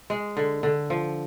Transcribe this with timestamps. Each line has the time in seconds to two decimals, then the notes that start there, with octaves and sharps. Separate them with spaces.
0.10 G#3
0.37 D3
0.63 D3
0.90 F3